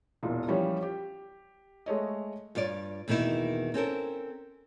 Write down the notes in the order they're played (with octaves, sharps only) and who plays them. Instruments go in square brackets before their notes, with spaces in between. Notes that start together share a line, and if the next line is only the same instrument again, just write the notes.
[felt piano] E1 A#2 E3
E3 F3 G3 C#4
G4
G#3 A3 C#5 D#5
[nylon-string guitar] G2 F4 C#5 D5
E2 B2 D#3 A#3 E4
C4 C#4 A4 A#4